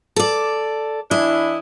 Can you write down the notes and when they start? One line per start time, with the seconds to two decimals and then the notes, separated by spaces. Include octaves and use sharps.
0.16 A4 D5
1.11 E3 D4 E4 D#5